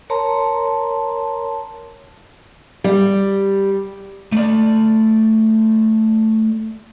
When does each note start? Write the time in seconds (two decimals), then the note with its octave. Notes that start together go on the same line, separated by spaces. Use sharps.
0.10 A#4 C#5 A5 A#5 C6
2.84 G3
4.32 A3 D5